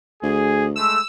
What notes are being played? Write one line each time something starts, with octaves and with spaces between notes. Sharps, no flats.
D2 G#4
G#3 A3 E6